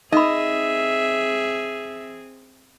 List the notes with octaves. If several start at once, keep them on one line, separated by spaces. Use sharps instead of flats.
C4 D#4 G#4 D#5 E5 B5